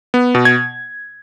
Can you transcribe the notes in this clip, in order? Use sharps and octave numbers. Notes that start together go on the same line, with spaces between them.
B3
B2
G#6